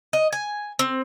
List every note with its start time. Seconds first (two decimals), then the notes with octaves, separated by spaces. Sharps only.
0.13 D#5
0.32 G#5
0.79 C4